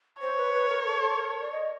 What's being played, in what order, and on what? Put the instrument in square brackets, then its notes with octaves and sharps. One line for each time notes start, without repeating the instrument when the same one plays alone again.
[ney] C5 [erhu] C#5
[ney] B4
B4
A#4
A4
A4
A#4
D5
D#5